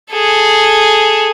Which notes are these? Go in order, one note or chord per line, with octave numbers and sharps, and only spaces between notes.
G#4 A4